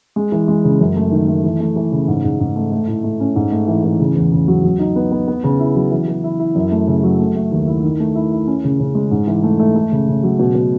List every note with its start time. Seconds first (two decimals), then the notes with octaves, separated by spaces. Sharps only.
0.16 G#3
0.32 E3
0.48 G#3
0.64 C#3
0.80 F#2
0.96 A3
1.12 D#3
1.28 A3
1.44 E3
1.60 A3
1.76 E3
1.92 C#3
2.08 G#2
2.24 G#2
2.40 G#2
2.56 A3
2.72 A3
2.88 A2
3.04 A3
3.20 C#4
3.36 G#2
3.52 A3
3.68 E3
3.84 E3
4.00 C#3
4.16 E2
4.32 C#3
4.48 F#3
4.64 F#3
4.79 D#4
4.96 B3
5.12 B3
5.28 B3
5.44 C#3
5.60 E4
5.76 F#3
5.91 E3
6.08 E3
6.24 E4
6.39 E4
6.55 F#2
6.72 A3
6.87 C#3
7.03 F#3
7.20 A3
7.36 A3
7.51 D#2
7.67 E4
7.83 D#3
8.00 A3
8.15 E4
8.31 E4
8.47 C#4
8.64 C#3
8.80 C#3
8.95 G#3
9.11 G#2
9.27 E3
9.43 A3
9.59 A3
9.76 A3
9.92 C#3
10.07 C#3
10.23 F#3
10.39 B2
10.55 B2